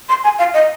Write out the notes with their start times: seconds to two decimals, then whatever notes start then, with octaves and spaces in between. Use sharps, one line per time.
0.09 C6
0.24 G#5
0.38 F5
0.54 D#5